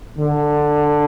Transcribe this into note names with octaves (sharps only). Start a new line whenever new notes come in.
D3